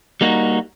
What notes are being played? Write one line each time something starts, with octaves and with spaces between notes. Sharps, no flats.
G3 A#3 D#4 F#4